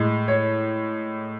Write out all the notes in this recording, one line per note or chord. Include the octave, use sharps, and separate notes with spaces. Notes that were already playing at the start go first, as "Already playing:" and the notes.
Already playing: A2 G#3
C#5